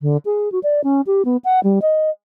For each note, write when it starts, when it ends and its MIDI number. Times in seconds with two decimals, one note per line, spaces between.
0.02 0.17 50
0.25 0.51 68
0.52 0.59 66
0.63 0.81 74
0.84 1.01 61
1.07 1.22 67
1.25 1.37 59
1.44 1.60 78
1.63 1.79 55
1.82 2.10 75